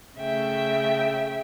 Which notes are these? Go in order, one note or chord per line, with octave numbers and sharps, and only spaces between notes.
C#3 A3 E5 G5